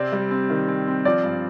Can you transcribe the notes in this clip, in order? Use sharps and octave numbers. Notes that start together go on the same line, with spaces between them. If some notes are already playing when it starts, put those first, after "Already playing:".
Already playing: C3 C4 D5
G3
C4
D#3
C4
C4
F3 D5
G2